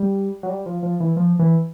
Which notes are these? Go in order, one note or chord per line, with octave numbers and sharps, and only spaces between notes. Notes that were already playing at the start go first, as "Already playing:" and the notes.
Already playing: G3
F#3
G3
F3
F3
E3
F3
E3